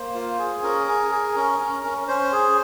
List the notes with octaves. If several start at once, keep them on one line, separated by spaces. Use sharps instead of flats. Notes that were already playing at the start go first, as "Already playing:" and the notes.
Already playing: A#3 C5
F4
G#4
C#4 A#4
G#4
G#4
C#4
C#4
C#4
C#4 C5
G#4